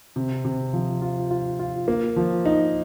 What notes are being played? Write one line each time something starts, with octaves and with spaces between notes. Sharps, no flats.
C3
C3
F3
F4
F4
F4
A#3
F3
D#4